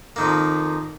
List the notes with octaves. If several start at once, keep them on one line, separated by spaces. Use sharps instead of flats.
F2 D#3 A#3